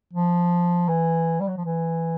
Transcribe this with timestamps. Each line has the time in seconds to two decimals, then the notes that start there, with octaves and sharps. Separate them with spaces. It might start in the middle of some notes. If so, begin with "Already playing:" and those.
0.13 F3
0.89 E3
1.40 G3
1.48 F#3
1.57 F3
1.65 E3